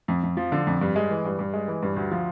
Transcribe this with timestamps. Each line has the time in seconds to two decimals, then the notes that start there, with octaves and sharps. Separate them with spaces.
0.08 F2
0.23 F2
0.37 F3
0.52 D3
0.67 F2
0.81 G2
0.96 G#3
1.10 E3
1.25 G2
1.39 G2
1.53 G#3
1.68 E3
1.82 G2
1.96 D2
2.11 F3